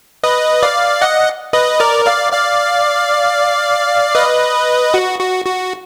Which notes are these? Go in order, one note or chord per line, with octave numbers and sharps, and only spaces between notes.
B4 D#5
D5 F5
D#5 F#5
B4 D#5
A#4 D5
D5 F5
D5 F5
B4 D#5
F#4
F#4
F#4